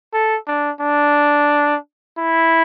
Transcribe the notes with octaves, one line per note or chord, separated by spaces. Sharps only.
A4
D4
D4
E4